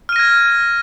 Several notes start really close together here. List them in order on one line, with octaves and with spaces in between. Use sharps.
F6 D#7 A#6 G#6